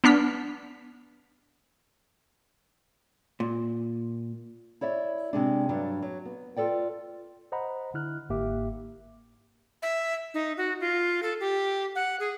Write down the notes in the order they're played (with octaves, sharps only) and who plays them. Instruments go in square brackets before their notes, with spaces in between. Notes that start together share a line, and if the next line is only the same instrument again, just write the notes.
[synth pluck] B3 D4 F6 B6
[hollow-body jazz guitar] A#2
[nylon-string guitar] E4 C#5 D5 E5
C3 G#3 D4
G2 F#3 D4
F#3
B3
F4 A4 D5 G5
[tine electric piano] C5 D#5 F#5 A#5 B5
D3 E4 F6 F#6
G1 G#2 A#3 G4 E5 D6
[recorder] E5
D#4
F#4
F4
A4
G4
F#5
G#4